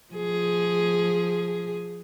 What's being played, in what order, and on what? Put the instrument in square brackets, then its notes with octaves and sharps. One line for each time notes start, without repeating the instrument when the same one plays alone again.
[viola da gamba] F3 G#4